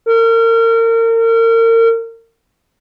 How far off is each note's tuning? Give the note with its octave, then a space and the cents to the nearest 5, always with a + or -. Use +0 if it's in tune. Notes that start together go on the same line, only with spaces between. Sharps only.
A#4 -35